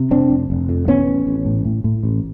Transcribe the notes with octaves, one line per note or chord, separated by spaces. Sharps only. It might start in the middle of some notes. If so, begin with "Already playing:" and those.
Already playing: C3
F1 C4 D4
F1
F1
F2
A1 B3 C#4
A1
A1
A2
A2
A2
A1